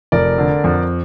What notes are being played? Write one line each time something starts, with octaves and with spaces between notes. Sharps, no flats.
F1 A#4 D5
D3
F2